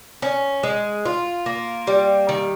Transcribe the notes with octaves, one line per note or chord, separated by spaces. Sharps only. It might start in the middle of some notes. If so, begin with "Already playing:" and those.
C#4
G#3
F4
A#3
G3
D#3